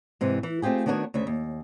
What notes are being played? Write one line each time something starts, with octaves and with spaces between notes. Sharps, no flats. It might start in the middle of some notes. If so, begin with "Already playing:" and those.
G#2 C3 E3
E3
A3 C4 F4 G4 G#4
D#3 B3 D4 F#4 B4 C#5
D2 C#3 E5
D#2